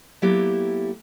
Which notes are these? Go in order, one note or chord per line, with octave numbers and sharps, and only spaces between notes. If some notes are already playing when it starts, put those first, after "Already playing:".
F#3 A#3 B3 E4 G4 A4